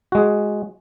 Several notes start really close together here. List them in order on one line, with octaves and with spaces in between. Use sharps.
F#4 G#3 G#4